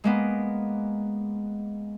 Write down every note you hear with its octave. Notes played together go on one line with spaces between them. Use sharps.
G#3 A#3 B3